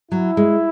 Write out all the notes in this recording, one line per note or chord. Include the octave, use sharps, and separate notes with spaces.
F#3 E4
G#3